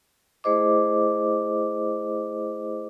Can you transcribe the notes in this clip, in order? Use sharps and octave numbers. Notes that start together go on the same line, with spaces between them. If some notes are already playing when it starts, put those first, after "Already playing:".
A3 E4 G#4 C5 D#5 D6